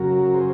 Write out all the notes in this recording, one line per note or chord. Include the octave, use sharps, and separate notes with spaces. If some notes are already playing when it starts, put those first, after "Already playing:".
Already playing: F#2 C#3 F#3 F#4 A#4
G#4 C5